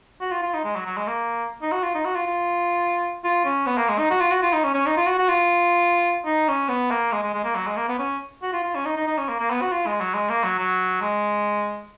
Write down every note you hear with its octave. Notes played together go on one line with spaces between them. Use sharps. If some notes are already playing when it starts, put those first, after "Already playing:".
F#4
F4
F4
D#4
G#3
F#3
F#3
G#3
A#3
D#4
F#4
F4
D#4
F#4
F4
F4
F4
C#4
B3
A#3
G#3
D#4
F#4
F4
F#4
F4
D#4
C#4
C#4
D#4
F4
F#4
F#4
F4
D#4
C#4
B3
A#3
G#3
G#3
G#3
A#3
F#3
G#3
A#3
B3
C#4
F#4
F4
F4
C#4
D#4
D#4
D#4
C#4
A#3
A#3
B3
F#4
F4
G#3
F#3
G#3
A#3
F#3
F#3
G#3